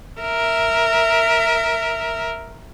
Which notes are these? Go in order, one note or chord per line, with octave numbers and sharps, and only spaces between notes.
A#4 E5